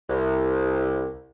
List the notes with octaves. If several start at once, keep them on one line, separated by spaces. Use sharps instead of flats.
C2